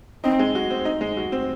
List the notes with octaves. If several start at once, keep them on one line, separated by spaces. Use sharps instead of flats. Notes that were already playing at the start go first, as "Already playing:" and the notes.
C4 D#4
G#3
F#4
C4
D#4
G#3
F#4
C4